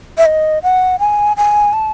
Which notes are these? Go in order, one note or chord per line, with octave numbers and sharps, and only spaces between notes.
E5
D#5
F#5
G#5
G#5
A5